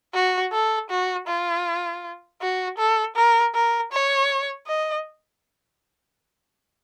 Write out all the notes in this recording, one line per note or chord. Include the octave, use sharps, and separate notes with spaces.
F#4
A4
F#4
F4
F#4
A4
A#4
A#4
C#5
D#5